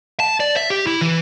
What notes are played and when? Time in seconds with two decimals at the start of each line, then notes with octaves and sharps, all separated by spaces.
0.20 A5
0.40 D5
0.56 E5
0.70 G4
0.87 E4
1.01 E3